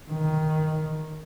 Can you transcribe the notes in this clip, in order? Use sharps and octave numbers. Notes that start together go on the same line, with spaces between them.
D#3